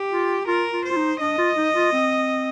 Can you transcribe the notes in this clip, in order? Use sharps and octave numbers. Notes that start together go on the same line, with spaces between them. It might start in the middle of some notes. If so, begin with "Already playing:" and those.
Already playing: G4
F4
F4 A#4
F4
C5
F4
D#4
D4 D#5
F4
D#4
F4
C4